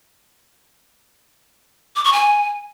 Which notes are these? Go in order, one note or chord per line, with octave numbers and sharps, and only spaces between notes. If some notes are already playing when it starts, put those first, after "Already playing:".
D6
C#6
G#5